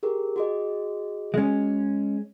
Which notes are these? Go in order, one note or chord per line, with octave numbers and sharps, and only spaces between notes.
G4 G#4 A#4
F#4 G#4 D#5
G#3 C#4